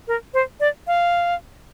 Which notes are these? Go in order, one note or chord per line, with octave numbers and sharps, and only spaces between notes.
A#4
C5
D5
F5